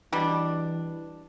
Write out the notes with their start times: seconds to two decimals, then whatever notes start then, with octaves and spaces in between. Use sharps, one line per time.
0.12 B2 E3 G3 D4